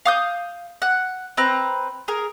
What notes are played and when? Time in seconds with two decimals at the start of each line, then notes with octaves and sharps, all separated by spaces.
0.05 F5 D#6 G6
0.82 F#5
1.37 C4 B4 A#5
2.08 G#4 A#4